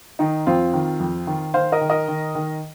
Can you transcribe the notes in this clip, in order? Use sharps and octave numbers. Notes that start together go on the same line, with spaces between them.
D#3 D#4
F2 C4 F4
D#3
F2
D#3
D#3 C5 F5
A#4 D#5
D#3
A#4 D#5
D#3
D#3